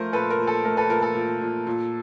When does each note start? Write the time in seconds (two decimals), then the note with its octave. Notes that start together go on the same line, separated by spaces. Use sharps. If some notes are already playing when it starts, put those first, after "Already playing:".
Already playing: F3 A3 A#4 C5
0.13 A#2 A4 B4
0.30 A#4
0.39 A#2
0.47 A4
0.64 A3 A#4
0.77 A4 B4
0.89 A#2 A#4
1.02 A4
1.15 A#2
1.41 A#2
1.67 A#2